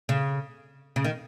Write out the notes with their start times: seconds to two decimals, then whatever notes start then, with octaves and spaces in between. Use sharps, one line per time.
0.09 C#3
0.96 C#3
1.05 D#3